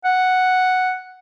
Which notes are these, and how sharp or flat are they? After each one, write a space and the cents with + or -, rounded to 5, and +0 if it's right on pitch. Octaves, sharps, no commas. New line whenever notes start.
F#5 +0